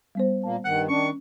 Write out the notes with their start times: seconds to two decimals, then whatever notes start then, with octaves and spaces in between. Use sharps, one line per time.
0.15 G3 B3 C5
0.44 A#2 A#3 A5
0.65 G2 D#3 F#5
0.89 D#3 C#4 D4 C#6